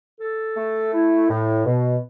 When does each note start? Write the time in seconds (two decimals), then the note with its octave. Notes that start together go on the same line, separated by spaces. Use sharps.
0.20 A4
0.57 A3
0.93 E4
1.30 A2
1.66 B2